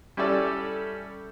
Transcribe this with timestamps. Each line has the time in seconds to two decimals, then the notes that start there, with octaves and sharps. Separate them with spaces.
0.17 G3 C#4 E4 G4 A4 D5